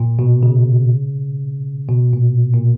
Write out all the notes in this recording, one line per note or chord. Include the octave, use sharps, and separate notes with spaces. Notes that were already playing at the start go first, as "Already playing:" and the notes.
Already playing: A#2
B2
C#3
B2
A#2
A#2